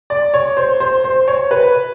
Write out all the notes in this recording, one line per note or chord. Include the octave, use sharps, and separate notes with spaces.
D5
C#5
C5
C5
C5
C#5
B4